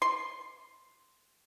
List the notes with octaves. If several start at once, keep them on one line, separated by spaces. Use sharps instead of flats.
C6